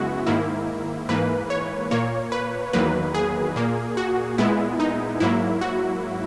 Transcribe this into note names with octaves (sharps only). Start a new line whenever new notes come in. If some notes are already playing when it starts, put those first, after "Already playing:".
Already playing: F#2 C#3 G#3 B3 E4 F#4
G#2 D#3 A#3 E4
G#2 E3 A#3 B4
C#5
A#2 A#3 C#5
B4
E2 D#3 F#3 A#3 B4
G#4
A#2 A#3
F#4
A#2 G#3 B3 E4
D#4
G#2 F#3 A#3 E4
F#4